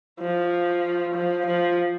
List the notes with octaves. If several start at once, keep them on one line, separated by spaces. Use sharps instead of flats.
F3
F3
F3